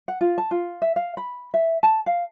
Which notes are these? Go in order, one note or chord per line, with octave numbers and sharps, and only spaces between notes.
F#5
F4
A5
F4
E5
F5
B5
E5
A5
F5